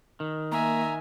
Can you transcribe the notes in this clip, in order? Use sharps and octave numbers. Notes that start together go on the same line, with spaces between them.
D#3
A#3 E5 G#5 A#5